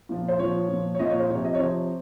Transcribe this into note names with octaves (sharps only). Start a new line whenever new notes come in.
A#2 F3
C5
A#2 F3 C#5
A#2 F3
C#5
A#2 F3 D#5
C#5
C5
C3 F3 C#5
D#5
C#5
C3 F3 C5